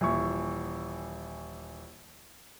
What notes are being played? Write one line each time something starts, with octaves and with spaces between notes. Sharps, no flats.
D#1 E3 C#6